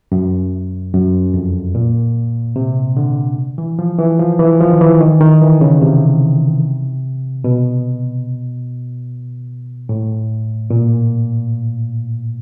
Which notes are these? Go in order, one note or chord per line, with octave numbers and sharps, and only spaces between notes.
F#2
F#2
F2
A#2
C3
D3
E3
F3
E3
F3
E3
F3
D#3
E3
D#3
D#3
E3
C#3
C3
B2
A2
A#2